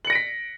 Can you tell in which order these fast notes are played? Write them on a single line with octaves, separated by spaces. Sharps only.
F#7 C#7 A#6 D7 B6